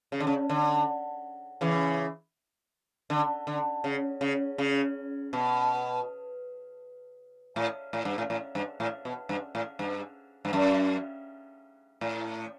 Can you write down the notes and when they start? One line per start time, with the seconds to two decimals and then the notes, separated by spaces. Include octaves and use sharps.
0.12 C#3
0.20 D3
0.27 C#3
0.49 D3
1.61 C#3 E3
3.10 D3
3.47 D3
3.84 C#3
4.21 C#3
4.58 C#3
5.33 B2
7.56 A2
7.93 A2
8.05 G2
8.18 A2
8.30 A2
8.55 G2
8.80 A2
9.05 B2
9.29 G2
9.55 A2
9.79 G2
10.45 G2
10.53 F#2
12.01 A2